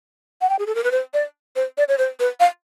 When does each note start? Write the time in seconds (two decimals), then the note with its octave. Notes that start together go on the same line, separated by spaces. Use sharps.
0.41 F#5
0.50 G5
0.59 G#4
0.67 A4
0.75 A#4
0.84 B4
0.92 C5
1.14 D5
1.56 C5
1.78 D5
1.88 C#5
1.98 C5
2.20 B4
2.40 F5